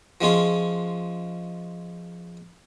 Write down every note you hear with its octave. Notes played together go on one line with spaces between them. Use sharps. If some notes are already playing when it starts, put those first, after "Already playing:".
F3 G#3 C#4 F4